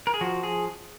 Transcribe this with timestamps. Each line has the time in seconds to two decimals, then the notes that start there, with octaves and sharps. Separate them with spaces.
0.07 A#4
0.14 G#4
0.21 F3 F#4
0.43 G#4